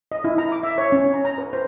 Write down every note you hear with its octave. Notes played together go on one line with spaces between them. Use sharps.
D#5
E4
A#5
D6
E5
C#5
C#4
A#5
A#5
B4
C5